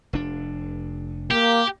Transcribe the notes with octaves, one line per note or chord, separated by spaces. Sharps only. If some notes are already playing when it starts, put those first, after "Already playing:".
F1 D4
A#3 G4